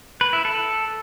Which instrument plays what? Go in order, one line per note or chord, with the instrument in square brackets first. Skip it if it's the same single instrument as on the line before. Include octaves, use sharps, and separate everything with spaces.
[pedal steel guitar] B4
E4
A4